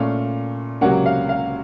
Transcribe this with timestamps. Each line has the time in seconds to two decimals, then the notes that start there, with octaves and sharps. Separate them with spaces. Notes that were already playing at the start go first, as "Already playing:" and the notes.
Already playing: A#2 A3 C#4 F5
0.81 C#2 C3 F#3 A#3 C#4 F#5
1.06 F5
1.29 F5